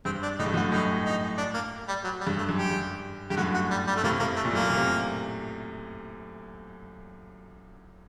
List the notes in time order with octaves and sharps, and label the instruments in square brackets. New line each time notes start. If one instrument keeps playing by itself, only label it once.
[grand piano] G2 [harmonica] C4
[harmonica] D4
[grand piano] A2 [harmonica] D#4
[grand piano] G2
[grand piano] F#2 A2 [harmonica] F#4
[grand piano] F#2 A2 [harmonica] D#4
[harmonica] D#4
D4
A#3
G3
F#3
G3
[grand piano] G2
[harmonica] A3
[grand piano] F#2
[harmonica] G4
[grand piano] G2
[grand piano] G2 [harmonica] G4
[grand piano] F#2 A2 [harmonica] F#4
[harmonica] F#4
G3
G3
A3
[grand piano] A2 C3 [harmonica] A#3
[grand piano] A2 C3 [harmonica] A#3
[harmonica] A3
[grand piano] A#2
[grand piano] F#2 A2 [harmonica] A#3
[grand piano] A#2
C3